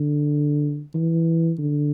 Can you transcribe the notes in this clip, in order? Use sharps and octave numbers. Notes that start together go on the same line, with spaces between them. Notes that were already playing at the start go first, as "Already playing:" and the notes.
Already playing: D3
E3
D3